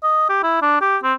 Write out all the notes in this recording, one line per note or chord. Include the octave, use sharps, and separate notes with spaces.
D#5
G4
E4
D4
G4
C4